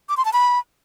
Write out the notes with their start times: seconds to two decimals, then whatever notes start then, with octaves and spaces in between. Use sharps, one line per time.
0.09 D6
0.17 C6
0.25 A5
0.33 B5